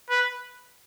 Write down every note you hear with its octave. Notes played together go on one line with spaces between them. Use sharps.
B4